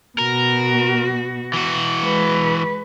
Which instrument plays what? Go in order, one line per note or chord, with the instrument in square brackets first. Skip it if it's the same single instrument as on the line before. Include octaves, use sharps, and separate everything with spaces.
[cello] B2 F#4 [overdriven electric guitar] A#4
[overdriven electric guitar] E3 F#4
[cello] G#3 B4